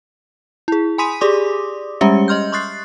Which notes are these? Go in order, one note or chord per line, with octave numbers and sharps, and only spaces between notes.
E4 G#4
G#5 B5 C6 D#6 B6 D#7
G4 G#4 D5 C6 D6 D#6
G3 G#3 C#4 G4 E5 C#7
D#5 C6 F6 G6
C6 C#6 D#6 F#6 A6 C7